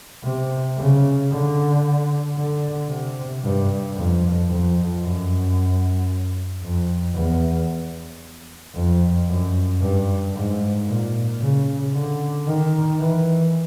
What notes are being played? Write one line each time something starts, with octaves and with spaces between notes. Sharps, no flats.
C3
C#3
D3
D3
C3
G2
F2
F2
F#2
F2
E2
F2
F#2
G2
G#2
A#2
C#3
D3
D#3
E3